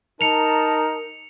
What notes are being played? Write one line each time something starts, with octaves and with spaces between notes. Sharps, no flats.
D#4 A#4 A5 C#7 F7